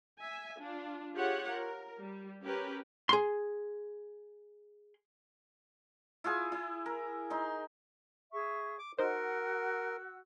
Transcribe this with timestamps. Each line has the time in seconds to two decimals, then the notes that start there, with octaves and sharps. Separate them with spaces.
0.19 E5 G#5
0.59 D4 F4
1.15 F4 G4 G#4 C#5 F#5
1.50 A#4
1.99 G3
2.43 C#4 G4 A#4 B4
3.09 G#4 C6
6.24 E4 F4 G#4 G#5
6.52 E4
6.86 A#4
7.30 D#4 C6
8.32 G#4 E5 C#6
8.79 D6
8.98 D#4 F#4 A#4 C5 F#5 E6